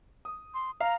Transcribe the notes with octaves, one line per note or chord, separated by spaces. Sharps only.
D#6
C6
F5 A#5